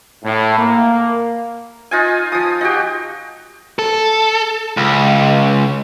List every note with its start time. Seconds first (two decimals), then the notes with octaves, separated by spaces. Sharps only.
0.24 A2
0.58 A#3
1.91 D#4 F4 G#5
2.32 F3 D#6
2.61 D#4 F#4 G4
3.79 A4
4.77 C#2